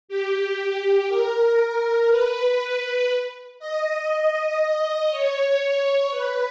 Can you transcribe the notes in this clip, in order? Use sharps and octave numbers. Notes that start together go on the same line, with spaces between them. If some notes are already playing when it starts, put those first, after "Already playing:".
G4
A#4
B4
D#5
D#5
C#5
B4